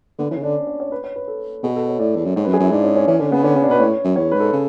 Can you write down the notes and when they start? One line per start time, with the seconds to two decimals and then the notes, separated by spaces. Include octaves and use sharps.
0.19 D3 B3
0.31 E3 C#4
0.38 C#3
0.43 D3 D4
0.67 C#5
0.80 C#5
0.92 B4
1.04 C#5
1.16 B4
1.28 A4
1.63 B2 G#4
1.76 A4
1.88 C#5
1.99 A2 D5
2.16 E2
2.25 F#2
2.36 G#2 C#5
2.45 B4
2.48 F#2
2.54 G#4
2.60 F#2 E4
2.72 G#2 D4
2.84 C#4
2.96 C#4
3.07 E3 C#4
3.20 D3 C#4
3.32 C#3 B3
3.44 D3 C#4
3.56 C#3
3.62 D4
3.68 B2 B4
3.80 A2 C#5
4.05 F#2
4.16 E2 C#5
4.32 G#2 B4
4.40 A4
4.53 C#3